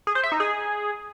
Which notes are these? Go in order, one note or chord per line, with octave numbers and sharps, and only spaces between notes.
G#4
C5
E5
D#4
G#4